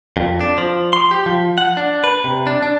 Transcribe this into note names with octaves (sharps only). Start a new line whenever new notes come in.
F2
D4
F3
C6
G4
F3
F#5
D4
B4
C3
D4
D4